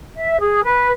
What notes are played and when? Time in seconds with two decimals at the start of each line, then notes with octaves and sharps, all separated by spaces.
0.15 E5
0.39 G#4
0.64 B4